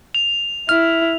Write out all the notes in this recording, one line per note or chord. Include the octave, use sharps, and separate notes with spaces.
F7
E4 F6